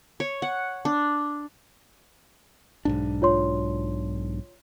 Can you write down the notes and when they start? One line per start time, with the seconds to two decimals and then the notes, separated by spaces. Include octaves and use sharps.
0.20 C#5
0.42 F#5
0.85 D4
2.85 B1 G#2 D4
3.22 F4 C#5 C6